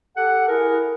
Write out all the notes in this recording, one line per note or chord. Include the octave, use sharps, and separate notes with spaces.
G4 A4 F#5
E4 G#4 A#4